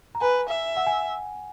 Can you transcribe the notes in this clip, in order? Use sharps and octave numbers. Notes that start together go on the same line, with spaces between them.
A#5
B4 G#5
E5
F#5
G#5